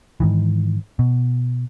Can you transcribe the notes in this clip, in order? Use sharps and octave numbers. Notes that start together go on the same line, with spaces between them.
G#2 D#3 E3
B2